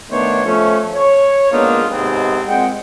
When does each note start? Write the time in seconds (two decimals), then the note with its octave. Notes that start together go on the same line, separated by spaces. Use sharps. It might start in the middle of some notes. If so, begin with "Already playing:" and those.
0.10 D#3 A3 B3 D4 C5 C#5
0.44 F3 A3 C#4
0.94 C#5
1.51 G#3 A#3 B3 D4 D#4 F4
1.89 D#2 G#2 C3 G#3 B3 C4
2.47 A#2 G#3 C4 F#5 G5